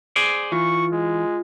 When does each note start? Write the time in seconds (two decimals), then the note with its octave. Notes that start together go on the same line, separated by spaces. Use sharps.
0.16 G#4 C5 D5
0.52 E3 F4 C#6
0.92 G#3